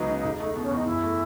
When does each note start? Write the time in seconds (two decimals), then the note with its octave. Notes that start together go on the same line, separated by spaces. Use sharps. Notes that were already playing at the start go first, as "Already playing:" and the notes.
Already playing: C#2 F#3 B3 D#4
0.08 C#3
0.24 E1
0.40 A3
0.56 B2
0.63 C#4
0.71 E2 D#4
0.86 F#2 E4
1.02 A3